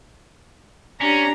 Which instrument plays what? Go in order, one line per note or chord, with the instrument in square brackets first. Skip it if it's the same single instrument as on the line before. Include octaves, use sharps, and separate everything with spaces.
[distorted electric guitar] C#4 [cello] D4 G4 [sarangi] A#5